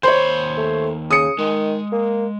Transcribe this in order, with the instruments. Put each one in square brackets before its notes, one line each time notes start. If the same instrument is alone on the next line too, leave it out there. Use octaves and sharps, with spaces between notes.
[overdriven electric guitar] D#2 B5 [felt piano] C5 C#5
[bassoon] A3
[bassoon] C#3 [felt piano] D#6 C#7
[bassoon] D#3 [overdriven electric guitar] G#3
[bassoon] A#3